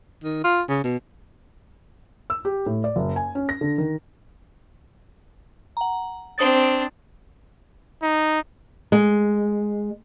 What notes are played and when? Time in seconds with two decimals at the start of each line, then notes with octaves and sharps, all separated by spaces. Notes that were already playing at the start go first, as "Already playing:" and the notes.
0.24 D#3
0.44 F4
0.69 C#3
0.84 B2
2.30 E6
2.45 G4
2.66 A2
2.84 D5
2.96 F#1
3.16 G#5
3.35 C#4
3.49 A#6
3.61 D3
3.78 D#3
5.77 F#5 A#5
6.38 C4 D4 C5 D#6 A6
8.02 D#4
8.92 G#3